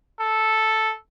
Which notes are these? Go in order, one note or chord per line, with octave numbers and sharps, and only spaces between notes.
A4